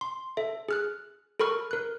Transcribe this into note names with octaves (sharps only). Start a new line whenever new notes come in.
C6
A4 E5
G#4 F6 F#6
A4 A#4 B5 C#6 F6
A#4 F#6